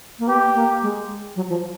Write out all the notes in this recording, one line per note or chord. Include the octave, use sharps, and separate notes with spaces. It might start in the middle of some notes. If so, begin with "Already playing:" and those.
A#3
B3 G4
A#3
G#3
F#3
F3